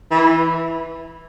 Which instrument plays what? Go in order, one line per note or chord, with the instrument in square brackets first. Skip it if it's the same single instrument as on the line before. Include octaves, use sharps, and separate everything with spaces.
[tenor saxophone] E3